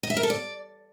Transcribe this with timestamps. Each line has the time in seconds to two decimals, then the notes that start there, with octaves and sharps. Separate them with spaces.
0.03 D#5
0.10 E5
0.17 A#4
0.23 A4
0.30 D5